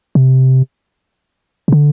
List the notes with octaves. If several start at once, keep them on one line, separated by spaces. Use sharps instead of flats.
C3
C3
D3